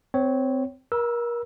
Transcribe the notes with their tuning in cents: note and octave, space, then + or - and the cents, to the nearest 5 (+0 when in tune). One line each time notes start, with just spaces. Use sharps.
C4 -20 C#5 +0
A#4 +30 B5 -30 E6 +0